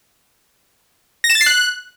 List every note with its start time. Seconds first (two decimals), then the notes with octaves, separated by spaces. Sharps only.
1.24 A#6
1.30 E7
1.35 A6
1.41 C7
1.46 F#6